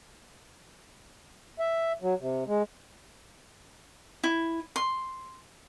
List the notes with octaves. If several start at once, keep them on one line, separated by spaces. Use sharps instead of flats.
E5
F#3
C3
G#3
E4
C6